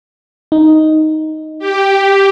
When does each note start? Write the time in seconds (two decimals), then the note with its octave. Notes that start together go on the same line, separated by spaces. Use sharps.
0.52 D#4
1.59 G4